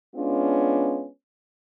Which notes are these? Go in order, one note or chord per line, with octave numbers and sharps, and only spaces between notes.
G#3 B3 C#4 D4 F4